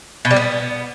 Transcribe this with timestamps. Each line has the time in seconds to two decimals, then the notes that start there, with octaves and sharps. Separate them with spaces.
0.25 B2
0.31 G3
0.36 B3